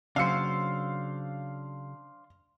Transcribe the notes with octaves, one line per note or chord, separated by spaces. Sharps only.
C#3 F#3 D4 C5 F5 E6 C#7